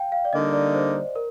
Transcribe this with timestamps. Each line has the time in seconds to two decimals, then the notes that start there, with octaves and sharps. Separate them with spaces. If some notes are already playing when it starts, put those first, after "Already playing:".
Already playing: F5 G5
0.12 F5
0.25 D5
0.33 D3 G3 A#3 D#4 D#5
0.53 D5
0.74 C5
1.16 A#4